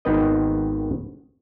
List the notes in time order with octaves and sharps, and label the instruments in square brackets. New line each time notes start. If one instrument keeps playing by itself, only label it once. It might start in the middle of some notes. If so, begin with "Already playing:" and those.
[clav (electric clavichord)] G#1 D#3 B3 C4 B4 D#5